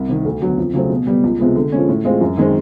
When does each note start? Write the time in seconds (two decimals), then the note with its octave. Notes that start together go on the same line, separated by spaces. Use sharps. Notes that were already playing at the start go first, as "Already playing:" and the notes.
Already playing: C2
0.09 C3 D#3
0.25 D2
0.42 D3 F#3 B3
0.57 F2
0.74 C#3 F#3 A3 C4
0.90 B2
1.07 G3 B3
1.24 C#2
1.39 C3 F3 G#3 B3
1.55 D3
1.72 F3 G#3 C#4
1.89 A2
2.04 E3 G#3 C4 F4
2.21 F#2
2.38 D#3 G#3 C4